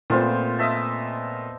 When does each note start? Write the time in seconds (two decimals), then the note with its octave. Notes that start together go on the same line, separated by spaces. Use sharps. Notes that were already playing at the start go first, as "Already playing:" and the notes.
0.10 A#2 A3 B3 C4 F4 C5
0.58 D#5 E5 A5